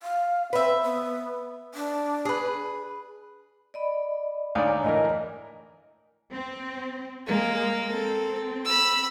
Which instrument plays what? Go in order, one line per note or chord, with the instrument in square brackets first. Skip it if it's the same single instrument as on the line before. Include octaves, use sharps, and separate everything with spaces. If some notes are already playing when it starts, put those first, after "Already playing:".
[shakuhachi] F5
[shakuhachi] C4 [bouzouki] B4 E5
[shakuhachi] B3
D4
[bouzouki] G#4 B4
[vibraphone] D5 D#5 B5
[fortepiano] D2 G#2 D#6 [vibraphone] C#5 G#5 A#5 [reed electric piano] D5 F5
[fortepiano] A2 E3 A#4 [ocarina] D#5
[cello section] C4
[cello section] G#3 [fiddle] A#3 A#4
[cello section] C4 [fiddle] A4
[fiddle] B5 E6